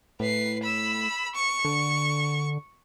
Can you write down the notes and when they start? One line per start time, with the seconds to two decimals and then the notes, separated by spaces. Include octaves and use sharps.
0.20 A2 B4 C7
0.63 B5 E6
1.35 C#6
1.65 D3